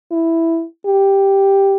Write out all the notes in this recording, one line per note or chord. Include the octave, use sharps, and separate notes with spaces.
E4
G4